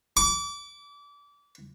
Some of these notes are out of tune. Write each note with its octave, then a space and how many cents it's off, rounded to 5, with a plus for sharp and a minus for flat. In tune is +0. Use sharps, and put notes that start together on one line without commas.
D6 -30